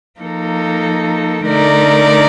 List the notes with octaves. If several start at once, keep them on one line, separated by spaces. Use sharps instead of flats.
F3 A#3 D#4 A4
D3 A3 D#4 A#4 D5